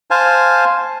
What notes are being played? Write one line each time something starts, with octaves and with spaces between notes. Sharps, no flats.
C5 F5 G#5 A5